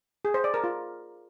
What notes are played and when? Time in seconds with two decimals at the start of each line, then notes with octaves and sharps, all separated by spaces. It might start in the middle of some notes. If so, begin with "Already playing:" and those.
0.25 G#4
0.34 C5
0.44 D5
0.54 A#4
0.64 F4